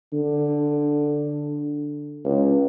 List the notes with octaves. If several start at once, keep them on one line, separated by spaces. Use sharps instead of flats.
D3
C#2